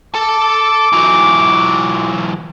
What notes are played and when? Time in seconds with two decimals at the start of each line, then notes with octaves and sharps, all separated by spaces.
0.15 A4 A5 D6
0.93 E3 F#3